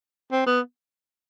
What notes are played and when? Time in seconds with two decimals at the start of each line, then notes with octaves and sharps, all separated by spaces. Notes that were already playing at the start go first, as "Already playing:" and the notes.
0.32 C4
0.46 B3